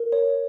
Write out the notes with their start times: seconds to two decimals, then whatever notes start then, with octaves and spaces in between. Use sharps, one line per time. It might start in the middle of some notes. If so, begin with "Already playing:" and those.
Already playing: A#4
0.12 C#5